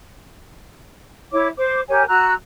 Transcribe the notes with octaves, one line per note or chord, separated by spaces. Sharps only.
E4 C#5 D6
C5 D6
G4 A#4 C#5 G#5
F#4 A#5 E6 F#6